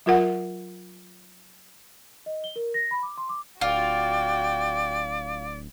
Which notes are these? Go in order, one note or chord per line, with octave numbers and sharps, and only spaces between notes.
F#3 F4 A#4 F#5
D#5
G7
A#4
A#6
B5
D6
C6
D6
D1 F4 F#4 D5 G5